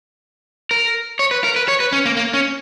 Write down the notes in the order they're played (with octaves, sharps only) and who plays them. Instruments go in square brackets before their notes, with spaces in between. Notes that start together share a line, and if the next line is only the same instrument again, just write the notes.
[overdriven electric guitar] A#4
C#5
B4
A#4
B4
C#5
B4
C#4
A#3
A#3
C#4